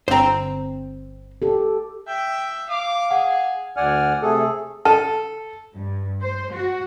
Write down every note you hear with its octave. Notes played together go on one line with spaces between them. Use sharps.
G1 C4 C5 A#5
G4 A4
E5 G5
F5 D6
G#4 F#5
D2 D5 F#5 G#5 F6
C3 A3 G#4 A4
A4 A5
G2
C5
F#4